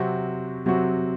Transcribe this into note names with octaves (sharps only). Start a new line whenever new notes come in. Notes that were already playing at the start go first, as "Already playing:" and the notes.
Already playing: C3 F#3 C4 F#4
C3 F#3 C4 F#4